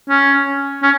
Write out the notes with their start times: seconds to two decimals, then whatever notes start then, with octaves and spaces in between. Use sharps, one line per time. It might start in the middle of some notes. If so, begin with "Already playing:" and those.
0.09 C#4
0.83 C#4